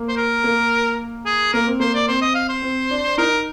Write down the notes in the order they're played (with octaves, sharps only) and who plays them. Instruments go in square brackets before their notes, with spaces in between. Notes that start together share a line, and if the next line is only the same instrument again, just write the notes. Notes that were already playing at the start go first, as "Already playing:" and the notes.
Already playing: [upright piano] A#3
[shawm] C5
A#4
[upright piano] A#3
[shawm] G#4
[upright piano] A#3 [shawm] A#4
[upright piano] C4
[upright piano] A#3 [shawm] C5
[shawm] D5
[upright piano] C4 [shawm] C5
[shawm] D#5
F5
C5
[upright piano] C4
D4
[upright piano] D#4 [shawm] A#4